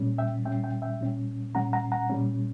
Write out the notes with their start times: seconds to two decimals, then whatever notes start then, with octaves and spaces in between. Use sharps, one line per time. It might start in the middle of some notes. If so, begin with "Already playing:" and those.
Already playing: A#2 G3 C#4
0.18 E5 G5
0.45 A#2 G3 C#4 E5 G5
0.64 E5 G5
0.82 E5 G5
1.01 A#2 G3 C#4
1.55 A#2 G3 C#4 F#5 A#5
1.73 F#5 A#5
1.92 F#5 A#5
2.09 A#2 G3 C#4